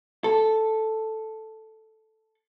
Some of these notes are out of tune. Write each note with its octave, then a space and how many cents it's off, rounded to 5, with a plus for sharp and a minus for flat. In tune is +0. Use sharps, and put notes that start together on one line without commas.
A4 +0